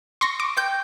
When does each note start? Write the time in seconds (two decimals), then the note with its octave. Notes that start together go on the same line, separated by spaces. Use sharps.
0.21 C6 C#6 A#6
0.40 D6
0.57 G5 G6